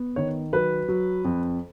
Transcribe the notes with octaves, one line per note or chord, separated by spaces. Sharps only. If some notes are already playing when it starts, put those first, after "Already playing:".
Already playing: B3
D#3 C#5
F#3 B4
F#3
F2